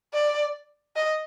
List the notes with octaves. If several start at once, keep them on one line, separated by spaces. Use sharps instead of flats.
D5
D#5